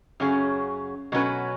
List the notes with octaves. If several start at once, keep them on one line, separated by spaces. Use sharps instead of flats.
F#2 C#3 F#3 C#4 G#4
B2 F#3 C#4 F#4 B4